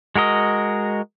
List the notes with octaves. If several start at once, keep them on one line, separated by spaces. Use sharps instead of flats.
G#3 F#4 A#4 D#5